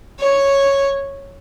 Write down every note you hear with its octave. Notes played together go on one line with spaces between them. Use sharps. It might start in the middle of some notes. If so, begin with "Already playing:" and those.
C#5